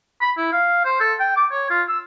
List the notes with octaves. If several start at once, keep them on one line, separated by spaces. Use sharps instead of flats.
B5
E4
F5
C5
A4
G5
D6
C#5
F4
E6